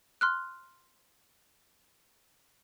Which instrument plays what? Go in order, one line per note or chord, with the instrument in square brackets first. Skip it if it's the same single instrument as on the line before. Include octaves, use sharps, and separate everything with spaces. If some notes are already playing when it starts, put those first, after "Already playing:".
[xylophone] C6 F6 F#6